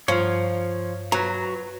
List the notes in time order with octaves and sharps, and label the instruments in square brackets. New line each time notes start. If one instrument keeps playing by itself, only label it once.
[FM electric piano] G2 [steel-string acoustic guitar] F3 [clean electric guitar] C#5 F5
[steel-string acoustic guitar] F#3 [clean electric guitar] B4 A#5